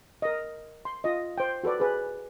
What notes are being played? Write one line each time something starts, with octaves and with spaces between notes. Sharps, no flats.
A#4 D#5
C6
F4 D#5
C5 G5
F#4 A4 B4 D5
G#4 B4